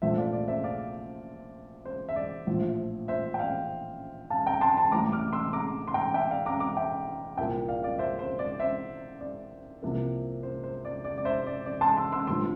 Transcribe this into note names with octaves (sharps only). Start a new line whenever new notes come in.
A#1 A#2 A3 C5 E5
D5 F5
D5
C5 E5
D5 F5
C5
E5
D5
A#1 A2 F3
C5 E5
G5
D5 F5
F5 A5
G5 A#5
A5 C6
A5 C6
A1 A2 G3 A#5 D6
D6 F6
C6 E6
A#5 D6
C6
G5 A#5
E5 G5
D5 F5
A#5 D6
A#5 D6
E5 G5
C2 A#2 G3 A#3 E5 G5
D5 F5
D5 F5
C5 E5
C5
D5
C5 E5
D5
C2 C3 F3 A#3
C5
C5
D5
D5
D5
C5 E5
D5
D5
A5 C6
C6 E6
C6 E6
A1 G2 D3 F3 C6 E6